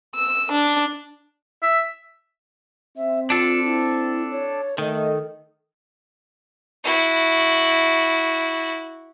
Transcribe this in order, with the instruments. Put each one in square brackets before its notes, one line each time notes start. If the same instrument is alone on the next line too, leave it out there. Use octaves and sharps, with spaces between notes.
[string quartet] E6
D4
[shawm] E5
[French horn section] C4 [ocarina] E5
[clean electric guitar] D4 A4 [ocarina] F4
[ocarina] E4
C#5
[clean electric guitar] D#3 [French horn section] A3 D#5 [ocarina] A4
[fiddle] E4 F#4